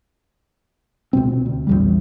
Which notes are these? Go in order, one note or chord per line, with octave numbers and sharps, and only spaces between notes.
C#2 B2 C4
D2
A#1 E2 G3